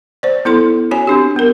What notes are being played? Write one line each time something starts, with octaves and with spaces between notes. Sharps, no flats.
C5 D5
B3 E4 A4 C6
C#4 F#4 C#5 G#5
C4 D4 G4
B3 A#4